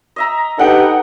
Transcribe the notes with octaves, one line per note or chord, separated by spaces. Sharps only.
D#5 E5 A#5
D#4 G4 A4 B4 F#5 G5